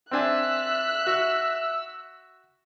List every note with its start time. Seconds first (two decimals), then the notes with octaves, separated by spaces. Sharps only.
0.11 C4 D4 E5 G#5 E6 F#6
1.07 F#4